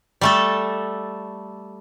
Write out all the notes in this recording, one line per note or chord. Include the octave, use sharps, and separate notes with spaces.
G3 A3 A4